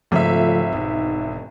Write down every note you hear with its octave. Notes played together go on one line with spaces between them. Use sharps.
G#1 C#3 F3 A3 F4 A4 E5 F5
E1 D#4